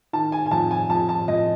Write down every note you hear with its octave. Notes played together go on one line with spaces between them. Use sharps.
D#3 A5
G#5
G#5
F2 A5
G#5
F2 A5
A5
F2 D#5